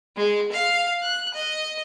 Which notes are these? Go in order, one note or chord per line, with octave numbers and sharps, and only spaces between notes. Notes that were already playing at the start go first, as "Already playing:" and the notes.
G#3
F5
F#6
D#5